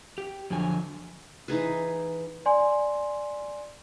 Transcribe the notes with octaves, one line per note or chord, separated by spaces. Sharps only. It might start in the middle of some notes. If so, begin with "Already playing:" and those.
G4
F2 D3 F3 F#3 G#5
E3 D#4 G#4 B4
D5 G#5 C6